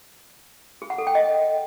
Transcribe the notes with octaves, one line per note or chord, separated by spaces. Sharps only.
G#4
F#5
A4
G5
D#5